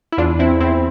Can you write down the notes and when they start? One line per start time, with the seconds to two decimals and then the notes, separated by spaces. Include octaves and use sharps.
0.12 E4
0.18 E2 D4 F4
0.39 C4 E4
0.60 E2 C4 E4